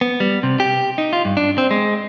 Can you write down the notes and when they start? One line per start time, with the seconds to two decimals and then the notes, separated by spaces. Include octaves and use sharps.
0.01 B3
0.20 G3
0.43 C3
0.60 G4
0.98 D#4
1.13 F4
1.25 G2
1.37 D4
1.58 C4
1.71 G#3